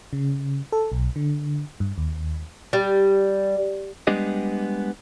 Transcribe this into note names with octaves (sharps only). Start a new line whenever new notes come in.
C#3
A4
B1
D3
G2
D#2
G3
G3 G#3 B3 D4 G4 D#5